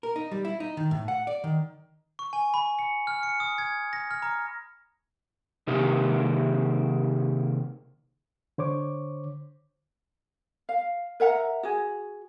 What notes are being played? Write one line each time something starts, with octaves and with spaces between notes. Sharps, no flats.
A#4
D#4
G3
E4
D#4
D#3
A2
F#5
D5
D#3
C#6
G#5
B5
C#7
F6
C#7
D#6
G#6
A#6
F6
A#5
C3 D#3 A#3 G4
D3 C5 C#5 D6
F5
A#4 E5 F#5 A#5
F#4 G#4